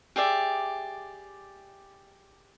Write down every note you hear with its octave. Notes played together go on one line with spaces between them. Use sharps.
G4 G#4 D5 E5